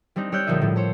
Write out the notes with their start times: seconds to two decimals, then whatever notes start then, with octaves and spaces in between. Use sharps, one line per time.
0.16 G3 C4 D4 D#4
0.32 G3 C#5 D5 E6 F#6 G6
0.47 A#1 D3 F3 D#4 E5
0.61 A2 F3 C#4 D4
0.76 A4 C5 C#5